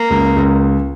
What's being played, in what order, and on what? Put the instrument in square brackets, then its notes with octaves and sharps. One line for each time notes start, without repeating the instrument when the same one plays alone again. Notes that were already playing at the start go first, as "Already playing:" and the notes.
Already playing: [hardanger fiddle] A#3
[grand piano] C#2
C#2